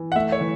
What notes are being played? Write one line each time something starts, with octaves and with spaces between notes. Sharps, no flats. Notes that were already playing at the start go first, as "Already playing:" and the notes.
Already playing: E3
F#5
A3 E5
C#5
E3